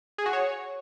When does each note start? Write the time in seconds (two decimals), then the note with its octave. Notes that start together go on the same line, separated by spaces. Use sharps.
0.18 G#4
0.26 F#4
0.33 C#5